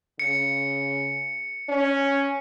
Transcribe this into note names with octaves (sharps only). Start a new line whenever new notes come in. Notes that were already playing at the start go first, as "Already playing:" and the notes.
C#3 C#7
C#4